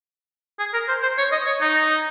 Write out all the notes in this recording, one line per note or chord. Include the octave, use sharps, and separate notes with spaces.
G#4
A#4
C5
C5
C#5
D#5
C#5
D#4